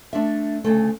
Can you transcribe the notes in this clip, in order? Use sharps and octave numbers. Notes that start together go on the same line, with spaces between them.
A3 D4 E5
D2 C#3 A3